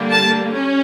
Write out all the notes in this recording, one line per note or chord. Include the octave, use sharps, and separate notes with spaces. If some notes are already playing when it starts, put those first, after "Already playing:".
Already playing: D3 G3 A#3
A5
C#4